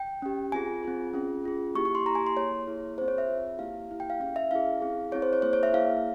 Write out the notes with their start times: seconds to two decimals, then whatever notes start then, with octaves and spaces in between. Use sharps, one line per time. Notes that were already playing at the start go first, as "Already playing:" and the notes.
Already playing: G5
0.22 C#4 G4
0.52 C4 F4 G#4 G#5
0.83 C4 F4 G#4
1.14 C#4 F4 G#4
1.44 C#4 F4 G#4
1.75 A#3 E4 G4 C#6
1.85 C#6
1.95 C6
2.05 A#3 E4 G4 A#5
2.15 G#5
2.27 C6
2.36 A#3 E4 G#4 C#5
2.67 A#3 E4 G#4
2.98 C4 F4 G#4 C5
3.08 C#5
3.18 E5
3.29 C4 F4 G#4
3.59 A#3 E4 G4 F5
3.89 A#3 E4 G4
4.00 G5
4.10 F5
4.20 C#4 E4 G#4 F5
4.36 E5
4.51 C#4 E4 G#4 F5
4.82 C4 E4 G#4
5.12 C4 E4 G#4 C#5
5.22 C5
5.33 C#5
5.42 A#3 E4 G#4 C5
5.53 C#5
5.63 E5
5.73 A#3 E4 G#4 F5